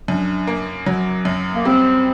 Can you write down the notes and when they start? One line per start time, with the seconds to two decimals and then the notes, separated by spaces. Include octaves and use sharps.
0.08 F#2 D4
0.47 A#3
0.86 F#3
1.25 F#2
1.54 A#3
1.65 G3 C4